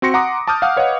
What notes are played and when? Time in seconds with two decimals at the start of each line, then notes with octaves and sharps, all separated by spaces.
0.02 C4 F#4 C6 A#6 C#7
0.14 F#5 A#5 C6 D6 D#6
0.47 A5 D6 D#6 F6 G6
0.62 F5 F#5 D#6 F6
0.76 B4 C#5 D#5 F5 F#5